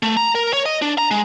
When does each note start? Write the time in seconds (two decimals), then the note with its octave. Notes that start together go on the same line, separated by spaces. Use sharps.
0.03 A3
0.17 A#5
0.35 A#4
0.53 C#5
0.66 D#5
0.82 D4
0.98 A#5
1.11 G#3